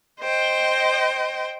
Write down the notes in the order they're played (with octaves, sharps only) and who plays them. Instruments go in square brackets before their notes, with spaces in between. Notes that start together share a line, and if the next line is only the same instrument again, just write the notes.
[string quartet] C5 D#5 G5